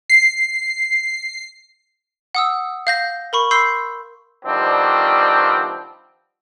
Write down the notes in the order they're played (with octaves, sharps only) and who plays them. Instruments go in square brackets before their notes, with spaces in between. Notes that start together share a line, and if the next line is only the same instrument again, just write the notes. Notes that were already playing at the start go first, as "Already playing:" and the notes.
[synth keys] C7
[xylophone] F#5 D#6 E6
F5 G6 A#6
A#4 B5 C#6
B5 C6 E6 G6 C7
[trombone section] D#3 F3 G3 B3 C4 D4